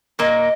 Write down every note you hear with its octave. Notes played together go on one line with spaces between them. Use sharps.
A#2 A#3 D#5